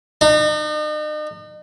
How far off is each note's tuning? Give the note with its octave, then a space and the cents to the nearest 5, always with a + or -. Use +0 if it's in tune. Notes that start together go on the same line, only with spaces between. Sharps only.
D#4 -40